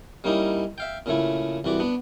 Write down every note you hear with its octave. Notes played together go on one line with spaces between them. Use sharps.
G3 A#3 C#4 D#4 E4
E5 F5 G5
A#2 C#3 A3 E4
C2 E3 F#4 D5
B3 D4